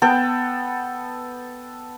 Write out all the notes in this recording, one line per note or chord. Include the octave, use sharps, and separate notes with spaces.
B3 A4 G5